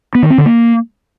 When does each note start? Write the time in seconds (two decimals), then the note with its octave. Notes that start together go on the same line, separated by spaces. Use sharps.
0.15 B3
0.23 D#3
0.30 C4
0.38 D3
0.46 A#3